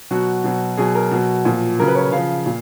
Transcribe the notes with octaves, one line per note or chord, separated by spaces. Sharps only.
B2 F#3 F#4
B2 F#3
B2 F#3 G#4
A#4
B2 F#3
A#2 F3
C#3 F#3 A#4
B4
C#5
C#3 F3 F5
A#2